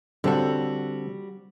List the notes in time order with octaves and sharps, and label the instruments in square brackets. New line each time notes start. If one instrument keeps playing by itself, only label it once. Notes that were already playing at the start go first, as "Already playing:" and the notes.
[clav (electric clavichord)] D3 C4 A4 [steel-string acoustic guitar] G3 F#4